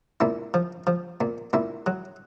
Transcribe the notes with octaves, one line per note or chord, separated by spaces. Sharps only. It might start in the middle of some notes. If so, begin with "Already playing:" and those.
A#2 E4
F3
F3
A#2
A#2 E4
F#3